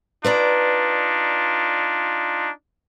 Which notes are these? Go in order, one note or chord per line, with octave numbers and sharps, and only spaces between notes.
D4 D#4 F4 B4 D5 A#5